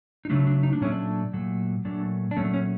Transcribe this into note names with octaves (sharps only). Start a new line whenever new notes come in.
D#4
C#3 F#3 A3 D4
D4
D#4
D4
A#2 F#3 A3 C#4
D4
A#2 F#3 A3
A#2 F#3 A3 D4
D4
A#2 F#3 A3 C#4
C#4